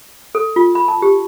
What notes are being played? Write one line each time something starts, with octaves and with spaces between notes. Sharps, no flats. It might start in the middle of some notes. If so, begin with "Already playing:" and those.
A4
F4
B5
A5
G4